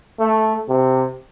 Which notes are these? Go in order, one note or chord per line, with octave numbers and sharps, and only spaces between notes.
A3
C3